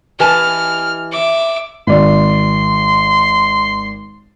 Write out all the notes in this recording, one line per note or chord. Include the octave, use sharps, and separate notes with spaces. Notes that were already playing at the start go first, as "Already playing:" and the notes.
E3 G4 B4 D#5 G#5 A5 F6
E5 D6
G#1 D5 C6